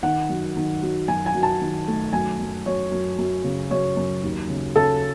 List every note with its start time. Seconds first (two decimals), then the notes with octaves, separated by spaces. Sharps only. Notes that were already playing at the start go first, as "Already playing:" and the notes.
0.03 D#3 F#5
0.29 F#2
0.56 D#3
0.83 F#3
1.08 F#2 G#5
1.26 G#5
1.35 F#2
1.43 A5
1.61 D#3
1.88 A3
2.13 F#2 G#5
2.40 F#2
2.66 F#2 C#5
2.92 F#2
3.19 F#2
3.44 C#3
3.71 F#2 C#5
3.97 F#2
4.24 D#2
4.50 C#3
4.76 C#3 A4